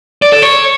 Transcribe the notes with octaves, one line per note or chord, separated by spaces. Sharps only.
D5
A4
C#5